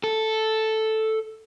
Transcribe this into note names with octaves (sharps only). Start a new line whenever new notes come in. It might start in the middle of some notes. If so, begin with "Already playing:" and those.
A4